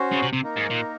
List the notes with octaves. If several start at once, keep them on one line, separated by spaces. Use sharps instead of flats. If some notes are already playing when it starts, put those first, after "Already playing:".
Already playing: C#4 F#4 C5
C#3
C3
C3
A#3 D#4 A#4
G#2
A#2